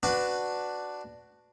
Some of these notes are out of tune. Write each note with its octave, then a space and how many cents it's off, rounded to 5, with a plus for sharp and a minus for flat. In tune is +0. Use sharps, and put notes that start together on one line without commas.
D4 +0 F#4 +0 B4 +10